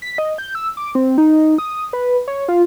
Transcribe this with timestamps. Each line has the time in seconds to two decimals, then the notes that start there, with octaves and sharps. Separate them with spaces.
0.02 B6
0.18 D#5
0.38 G6
0.55 E6
0.77 D6
0.95 C4
1.18 D#4
1.58 D#6
1.93 B4
2.28 C#5
2.48 F4